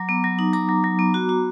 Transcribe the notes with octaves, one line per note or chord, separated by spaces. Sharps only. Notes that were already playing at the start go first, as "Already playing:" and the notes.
Already playing: F#3 A#5 D6
B3
F#3
D#4
F#3 A#5 D6
F#3
F#3
B3
F#4
F#4